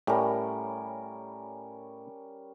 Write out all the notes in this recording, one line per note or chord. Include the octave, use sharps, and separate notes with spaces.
A2 G3 C#4 A#4